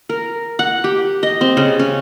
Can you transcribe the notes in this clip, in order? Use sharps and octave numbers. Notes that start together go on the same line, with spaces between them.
A#4
F#5
G4
D#5
C4
C#3
C#4